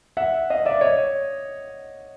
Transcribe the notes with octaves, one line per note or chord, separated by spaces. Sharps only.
E5 F#5
D#5 F5
D5 E5
C#5 D#5